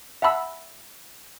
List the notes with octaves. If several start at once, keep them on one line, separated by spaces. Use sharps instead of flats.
E5 F#5 A5 B5 E6